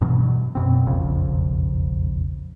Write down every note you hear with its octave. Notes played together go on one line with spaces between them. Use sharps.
G2 B2 E3 F#3
F#2 B2 C4
E1 A#1 F2 C#3